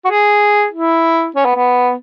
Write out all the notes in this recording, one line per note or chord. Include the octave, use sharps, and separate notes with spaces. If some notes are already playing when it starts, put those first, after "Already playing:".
F#4
G#4
E4
C#4
B3
B3